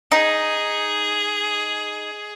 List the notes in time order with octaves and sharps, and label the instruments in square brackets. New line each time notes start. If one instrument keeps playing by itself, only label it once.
[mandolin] D#4 [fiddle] G#4